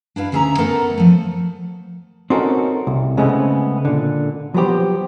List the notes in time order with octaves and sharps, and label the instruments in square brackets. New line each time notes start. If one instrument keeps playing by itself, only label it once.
[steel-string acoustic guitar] D4 E4 B4 F5
D2 C#4 G#4 E5 A5 A#5
A3 B3 A4 A#4
F3 A3
[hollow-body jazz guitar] C4 C#4 D#4 F#4 A4 A#4
C2
C#3 G#3 A3 B3 C4
A#2 D3
F3 F#3 B3 G4 C5